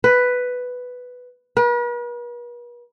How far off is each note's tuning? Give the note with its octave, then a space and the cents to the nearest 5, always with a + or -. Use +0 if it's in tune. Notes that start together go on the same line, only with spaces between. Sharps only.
B4 +5
B4 -45